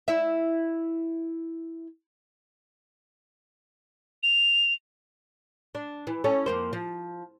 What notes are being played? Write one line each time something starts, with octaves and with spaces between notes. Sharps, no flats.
E4 E5
F7
D4
E3
C#4 A4 C#5
F2 A#3 C5
F3